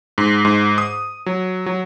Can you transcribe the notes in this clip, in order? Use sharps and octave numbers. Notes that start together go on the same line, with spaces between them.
G#2
G#2
D#6
F#3
F#3